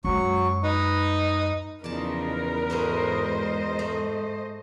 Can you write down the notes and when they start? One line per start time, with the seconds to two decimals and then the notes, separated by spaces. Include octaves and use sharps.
0.05 F#2 F#3 G#3 C#6
0.64 D#4 B4
1.84 E2 C#3 F3 D#4 A#4 B4 D5 A5
2.70 G#2 A3 F#4 G#4 C5 D#5
3.79 A3